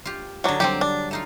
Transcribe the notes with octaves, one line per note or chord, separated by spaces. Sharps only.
F4 G4
D3 F#3 D4 D#4
F#3 G3 C4 G4
D4
A3 D#4 F4